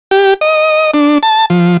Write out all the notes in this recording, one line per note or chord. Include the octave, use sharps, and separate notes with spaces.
G4
D#5
D4
A5
F3